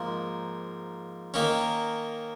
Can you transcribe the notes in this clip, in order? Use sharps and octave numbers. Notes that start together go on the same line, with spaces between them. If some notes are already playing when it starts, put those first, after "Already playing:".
Already playing: G#2 F3 A#3
D#3 A#3 C#4